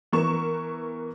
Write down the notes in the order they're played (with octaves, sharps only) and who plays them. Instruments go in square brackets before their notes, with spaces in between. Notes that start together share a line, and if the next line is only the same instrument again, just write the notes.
[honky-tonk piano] E3 B3 A#4 C#6 E7